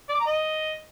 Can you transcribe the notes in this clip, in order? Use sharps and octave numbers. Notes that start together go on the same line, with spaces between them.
D5
D6
A#5
D#5